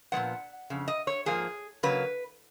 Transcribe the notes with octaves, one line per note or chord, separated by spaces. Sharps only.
A#2 F3 G#3 B3 F#5
F2 C#3
D#5
C#5
G#2 F3 A#3 G#4
C#3 F#3 A#3 B4